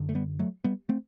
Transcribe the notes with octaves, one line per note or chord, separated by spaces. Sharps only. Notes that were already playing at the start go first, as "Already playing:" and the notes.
Already playing: F#2 D3
A3
G3 B3
F#3 A3
G3 B3
A3 C4